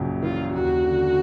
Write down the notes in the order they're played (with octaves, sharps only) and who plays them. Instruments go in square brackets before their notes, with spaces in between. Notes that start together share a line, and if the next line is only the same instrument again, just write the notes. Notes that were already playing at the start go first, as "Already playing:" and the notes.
Already playing: [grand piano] A#1 F#2 C#3
[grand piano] E3 [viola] F4
[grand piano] D#2 [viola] F#4
[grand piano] D3